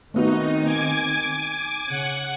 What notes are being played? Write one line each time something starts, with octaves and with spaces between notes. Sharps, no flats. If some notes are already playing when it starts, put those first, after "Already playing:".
D#3 A3 B3 C4 D#4 F#4
A#3 G#5 D6 G#6
C#3 F#5